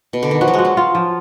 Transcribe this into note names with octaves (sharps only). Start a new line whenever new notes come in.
B2
D3
D#3
F3 F#4
F#3
G#3 F#4
F#3
F4
F3